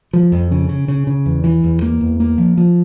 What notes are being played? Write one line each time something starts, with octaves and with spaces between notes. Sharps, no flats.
F3
F2
C#3
C#3
C#3
C#3
E2
E3
E2
A#3
E2
A#3
F3
F3